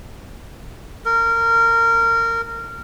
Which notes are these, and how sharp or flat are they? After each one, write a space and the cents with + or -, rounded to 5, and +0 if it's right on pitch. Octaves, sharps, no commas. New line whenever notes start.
A#4 -20